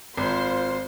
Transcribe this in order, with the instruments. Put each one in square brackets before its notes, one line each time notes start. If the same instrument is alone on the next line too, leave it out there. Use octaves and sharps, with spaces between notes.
[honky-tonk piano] G#1 [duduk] F4 [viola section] C5 C6